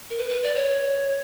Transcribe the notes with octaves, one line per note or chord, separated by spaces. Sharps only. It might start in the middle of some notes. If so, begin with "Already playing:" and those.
A#4
B4
B4
D5
C#5